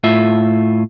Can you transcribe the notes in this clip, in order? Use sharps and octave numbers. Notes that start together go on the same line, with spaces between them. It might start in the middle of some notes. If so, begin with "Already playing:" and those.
A2 F4 E5